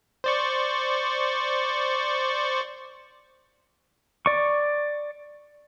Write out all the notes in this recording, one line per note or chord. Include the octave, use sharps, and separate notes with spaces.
C5 D5 C#6
D5 C#6